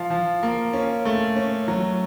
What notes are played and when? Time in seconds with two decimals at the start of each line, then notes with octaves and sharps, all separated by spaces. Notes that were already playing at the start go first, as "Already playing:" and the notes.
Already playing: F3 F4
0.10 F3
0.43 A#3
0.73 C#4
1.05 A3
1.36 C#4
1.68 F#3